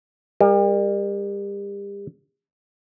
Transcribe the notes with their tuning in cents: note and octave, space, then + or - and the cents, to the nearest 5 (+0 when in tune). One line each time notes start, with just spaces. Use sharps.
G3 +35 A#4 +0